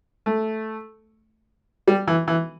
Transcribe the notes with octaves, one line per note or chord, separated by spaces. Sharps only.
A3
G3
E3
E3